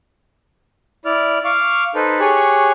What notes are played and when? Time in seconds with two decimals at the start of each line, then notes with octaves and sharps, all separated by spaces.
1.05 E4 D5 F6
1.45 F5 C#6 D6 F6
1.95 D#4 A4 B4 C5
2.20 G4 G#4 C#5 C#6 F#6